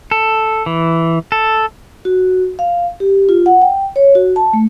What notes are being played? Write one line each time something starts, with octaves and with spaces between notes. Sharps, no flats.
A4
E3
A4
F#4
F5
G4
F4
F#5
G5
C#5
F#4
A5
A3